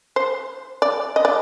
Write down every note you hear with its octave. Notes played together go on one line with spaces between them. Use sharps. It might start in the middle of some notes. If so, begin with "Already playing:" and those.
C5
D5
D#5
D5